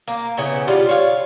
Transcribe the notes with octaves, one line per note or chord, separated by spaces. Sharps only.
A#3
C#3 E3 B3
G3 F4
C#5 F5